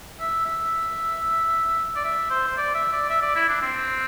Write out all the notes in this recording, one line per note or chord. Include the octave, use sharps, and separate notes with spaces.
E5
E5
D5
E5
C5
C5
D5
E5
D5
E5
D5
E4
D4
C4